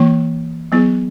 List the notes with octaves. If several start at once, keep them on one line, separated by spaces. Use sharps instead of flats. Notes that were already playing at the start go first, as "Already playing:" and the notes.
Already playing: E3 A#3 E4
F#3 B3 E4 G#4